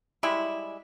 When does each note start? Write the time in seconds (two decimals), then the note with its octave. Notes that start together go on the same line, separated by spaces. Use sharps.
0.23 G3 G#3 E4